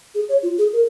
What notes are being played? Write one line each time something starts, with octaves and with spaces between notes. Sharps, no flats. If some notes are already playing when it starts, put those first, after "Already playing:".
G#4
C#5
F4
G#4
A#4